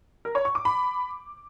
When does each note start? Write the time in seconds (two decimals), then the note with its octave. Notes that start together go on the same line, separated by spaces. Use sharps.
0.25 A#4
0.35 C#5
0.45 C#6
0.55 D6
0.65 B5